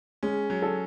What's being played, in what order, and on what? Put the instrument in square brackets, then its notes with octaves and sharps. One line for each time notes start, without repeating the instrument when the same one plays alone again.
[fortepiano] G#3 [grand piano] C#4
[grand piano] F#3
[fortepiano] A4